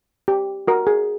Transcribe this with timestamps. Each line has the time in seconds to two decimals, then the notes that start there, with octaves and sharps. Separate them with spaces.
0.28 G4
0.68 F#4 A#4
0.87 G#4